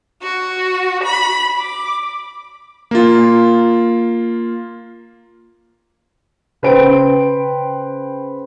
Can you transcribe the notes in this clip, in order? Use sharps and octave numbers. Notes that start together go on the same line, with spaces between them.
F#4
B5
D6
A#3 F4
C#3 B4 C5 G5 D7